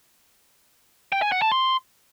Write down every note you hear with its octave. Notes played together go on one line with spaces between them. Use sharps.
G5
G#5
F#5
A5
C6